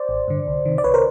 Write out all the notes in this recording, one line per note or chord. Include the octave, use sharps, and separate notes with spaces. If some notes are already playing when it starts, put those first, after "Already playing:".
Already playing: C5 D5
A1
G2 D3
C2
C3 D#3
D5
C2 B4 C#5
A#4 C5